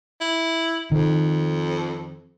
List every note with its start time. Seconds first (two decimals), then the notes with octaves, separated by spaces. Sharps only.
0.21 E4
0.92 F2 D#3